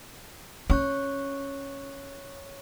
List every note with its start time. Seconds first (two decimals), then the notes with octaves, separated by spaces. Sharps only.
0.70 C#4 C#5 C#6 F#6